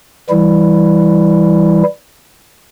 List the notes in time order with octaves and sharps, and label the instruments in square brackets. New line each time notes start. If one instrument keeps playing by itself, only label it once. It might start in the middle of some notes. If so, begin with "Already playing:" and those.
[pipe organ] E3 G3 E4